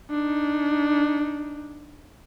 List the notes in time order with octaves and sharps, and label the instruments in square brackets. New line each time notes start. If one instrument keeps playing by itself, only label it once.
[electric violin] D4 D#4